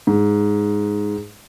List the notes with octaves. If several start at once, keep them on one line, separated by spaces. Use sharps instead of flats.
G#2